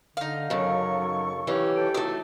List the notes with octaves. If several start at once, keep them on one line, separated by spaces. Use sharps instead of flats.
D3 D#4 F5
F#2 C#3 F#3 A4 C#5 C#6
D#2 E3 C#4 G4
A4 D6 G6
F#3 A3 D#4 A5 D6 E6